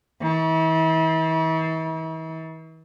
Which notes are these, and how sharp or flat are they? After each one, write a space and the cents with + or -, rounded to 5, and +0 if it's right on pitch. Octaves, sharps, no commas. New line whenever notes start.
E3 -40